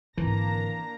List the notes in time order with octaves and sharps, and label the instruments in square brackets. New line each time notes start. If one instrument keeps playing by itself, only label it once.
[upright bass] G#1 D3 [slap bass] E3 [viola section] A#3 D4 A#5